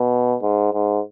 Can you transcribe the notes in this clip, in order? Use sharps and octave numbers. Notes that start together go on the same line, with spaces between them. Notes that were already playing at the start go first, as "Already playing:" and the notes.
Already playing: B2
G#2
G#2